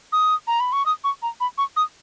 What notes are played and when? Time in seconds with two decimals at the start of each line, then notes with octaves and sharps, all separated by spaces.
0.13 D#6
0.47 A#5
0.60 B5
0.73 C#6
0.86 D#6
1.04 C#6
1.22 A#5
1.40 B5
1.58 C#6
1.77 D#6